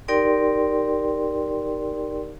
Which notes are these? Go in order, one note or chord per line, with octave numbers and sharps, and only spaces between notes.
D#4 G4 A#4 D5 G5 C6